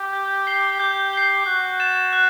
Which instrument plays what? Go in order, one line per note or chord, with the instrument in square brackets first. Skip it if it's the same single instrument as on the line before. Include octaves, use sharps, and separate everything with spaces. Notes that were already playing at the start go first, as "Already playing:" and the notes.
Already playing: [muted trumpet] G4
[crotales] G6
C7 G7
[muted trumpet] G4 [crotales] G6
[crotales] C7 G7
[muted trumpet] F#4 [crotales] F#6
[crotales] A6 E7
F#6